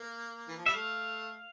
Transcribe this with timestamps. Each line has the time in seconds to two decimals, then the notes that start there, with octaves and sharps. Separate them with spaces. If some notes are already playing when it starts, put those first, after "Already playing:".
Already playing: A#3
0.48 E3
0.57 F3
0.66 G3 E5
0.74 A3 F5